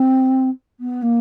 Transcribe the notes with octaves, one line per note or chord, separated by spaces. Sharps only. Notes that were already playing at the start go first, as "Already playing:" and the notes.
Already playing: C4
B3
A#3